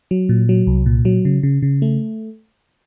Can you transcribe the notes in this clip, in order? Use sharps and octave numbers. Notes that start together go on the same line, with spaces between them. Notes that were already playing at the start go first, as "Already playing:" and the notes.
F#3
A#2
F#3
C2
A#2
F#3
C#3
C#3
C#3
A3